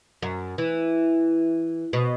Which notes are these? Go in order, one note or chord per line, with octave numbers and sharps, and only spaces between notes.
F#2
E3
B2